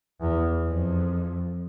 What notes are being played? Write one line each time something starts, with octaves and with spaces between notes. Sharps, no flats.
E2
F2